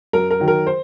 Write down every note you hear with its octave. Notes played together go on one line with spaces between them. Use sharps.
F#2 A#4
A#4
D#3 F#3
A#4
C5